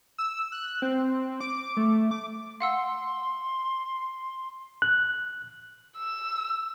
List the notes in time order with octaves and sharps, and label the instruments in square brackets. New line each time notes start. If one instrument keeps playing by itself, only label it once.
[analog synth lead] E6
F#6
C4
D6
A3
D6
[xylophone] F5 F#5 E6 [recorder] C6
[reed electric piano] F#6
[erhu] E6